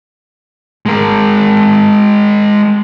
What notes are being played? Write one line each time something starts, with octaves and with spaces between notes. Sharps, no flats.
G#3 A#4